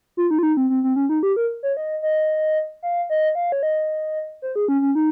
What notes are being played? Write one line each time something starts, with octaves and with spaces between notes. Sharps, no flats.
F4
D#4
F4
D#4
C4
C4
C4
C#4
D#4
G4
A#4
C#5
D#5
D#5
F5
D#5
F5
C#5
D#5
C5
G#4
C#4
C#4
D#4